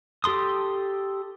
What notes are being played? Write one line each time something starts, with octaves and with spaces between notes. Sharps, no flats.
G4 A4 C6 D#6